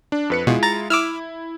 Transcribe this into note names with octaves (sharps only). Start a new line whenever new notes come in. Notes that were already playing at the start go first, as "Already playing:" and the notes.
D4
F2 B4 C#7
B2 G#3 E4 F4
A#5 A6
E4 D6 E6 F6